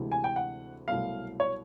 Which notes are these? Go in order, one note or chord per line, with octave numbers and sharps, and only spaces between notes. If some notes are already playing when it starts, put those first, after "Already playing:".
Already playing: D2 C3 E3 G#3
G#5
G5
F#5
C2 B2 F#3 A3 F5
C#5